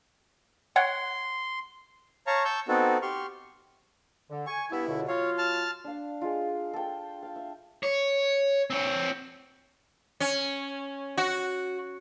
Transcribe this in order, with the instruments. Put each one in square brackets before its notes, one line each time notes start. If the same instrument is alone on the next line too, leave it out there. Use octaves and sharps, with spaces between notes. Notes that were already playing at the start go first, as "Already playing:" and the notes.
[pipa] C#5 F#5 G5 [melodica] C6
[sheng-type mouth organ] C#5 F5 A5 A#5 C#6
A5 C#6 E6 G6
B3 C4 D#4 F#4 A4
G4 C6 C#6 F6
[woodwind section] D3
[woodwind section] G#5 [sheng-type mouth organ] C#6
[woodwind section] G2 B3 E5 [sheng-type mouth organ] E4
[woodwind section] C#2 B2 D3
[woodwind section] F#3 F4 F5 [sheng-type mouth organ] C#5
[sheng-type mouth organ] A5 F6
[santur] D4 F5
G#3 F4
A4 G5
F5
E5
[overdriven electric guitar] C#5
C4 C#5
[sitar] C#4
F#4